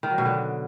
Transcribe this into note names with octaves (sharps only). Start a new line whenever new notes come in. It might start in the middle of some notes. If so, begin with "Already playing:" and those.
D#3
F#3
B2
D3